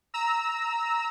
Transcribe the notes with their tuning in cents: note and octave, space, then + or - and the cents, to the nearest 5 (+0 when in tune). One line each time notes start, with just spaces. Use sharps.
A#5 +0 E6 -20